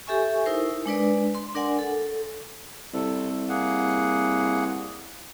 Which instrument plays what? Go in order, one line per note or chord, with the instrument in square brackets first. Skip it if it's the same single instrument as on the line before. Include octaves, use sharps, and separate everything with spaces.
[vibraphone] G4 A4 E5 G#5 C#6
D#4 E4 A#4 C5
G#3 D4 B4 D5
C6
D4 A#4 D5 F#5 G#5
A4
[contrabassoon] C2 [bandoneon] C3 A4
[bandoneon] A#3 G#4 F#5